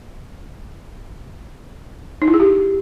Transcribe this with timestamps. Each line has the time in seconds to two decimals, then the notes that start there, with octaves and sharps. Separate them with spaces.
2.22 D#4
2.28 E4
2.34 G#4
2.40 G4